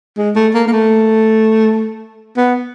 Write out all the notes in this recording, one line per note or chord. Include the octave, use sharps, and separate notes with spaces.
G#3
A3
A#3
A#3
A3
B3